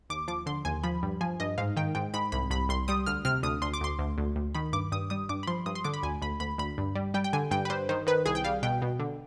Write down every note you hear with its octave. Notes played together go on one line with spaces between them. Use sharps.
D#2 D6
F3 D6
D3 C6
D#2 G#5
F3 B5
G2
F3 G#5
G2 D#5
G#2 F5
D#3 G5
G#2 G5
G#2 B5
C2 B5
C2 B5
C2 C6
G3 D#6
D2 F6
C3 F6
D2 D#6
D2 C6
D6
D2 C6
D2
D2
D2
D#3 B5
G2 D6
G2 D#6
G3 D#6
G2 D6
B5
F3 C6
G2 D#6
C6
D3 D6
B5
D2 G#5
D2 B5
D2 B5
D2 B5
G2
G3
G3 G5
G5
D3 G#5
G2 G5
B4
G2 C5
D#3 C5
D#3 B4
C2 G#4
G5
G3 F5
B2 G5
B2
D3